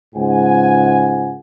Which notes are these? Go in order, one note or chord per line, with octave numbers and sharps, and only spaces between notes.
C#2 G#2 F4 F#5 G#5